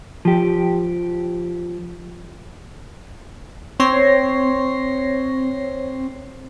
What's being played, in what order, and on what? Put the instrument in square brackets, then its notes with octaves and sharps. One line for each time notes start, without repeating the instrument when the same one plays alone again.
[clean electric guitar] F3 G4
[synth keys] C4 C#5 C6 A#6 C7